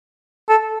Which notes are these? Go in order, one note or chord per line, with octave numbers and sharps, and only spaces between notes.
A4